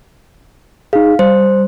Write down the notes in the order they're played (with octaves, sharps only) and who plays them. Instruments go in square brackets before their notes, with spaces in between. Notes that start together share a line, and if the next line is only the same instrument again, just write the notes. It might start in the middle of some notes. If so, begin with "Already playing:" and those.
[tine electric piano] D#4 G#4 [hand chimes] F5
[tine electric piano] G3 [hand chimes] C5